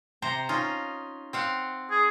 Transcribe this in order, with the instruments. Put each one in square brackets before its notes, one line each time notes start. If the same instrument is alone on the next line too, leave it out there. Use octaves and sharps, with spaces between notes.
[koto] C3 C5 A#5
C#4 D#4 F4
C4 F5 F#5
[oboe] G#4